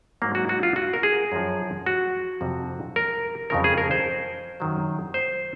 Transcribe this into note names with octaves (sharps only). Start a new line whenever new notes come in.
G#2 F#3 A#3
F#4
F#4
F4
F#4
A#4
G#4
F#2 F3
F#4
F2 C3 F3
A#4
F2 C#3 F3 A#4
G#4
A#4
C5
F#2 D#3 F#3
C5